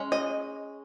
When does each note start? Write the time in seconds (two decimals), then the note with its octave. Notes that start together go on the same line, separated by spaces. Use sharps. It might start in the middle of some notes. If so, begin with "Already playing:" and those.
Already playing: G#3 C#4
0.12 D#5